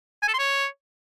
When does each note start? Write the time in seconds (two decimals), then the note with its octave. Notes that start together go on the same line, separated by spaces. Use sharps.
0.23 G#5
0.28 A4
0.34 C6
0.39 C#5